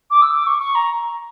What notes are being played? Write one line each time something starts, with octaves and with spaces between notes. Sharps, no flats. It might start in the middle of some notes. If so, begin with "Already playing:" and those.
D6
E6
D6
C#6
C#6
A#5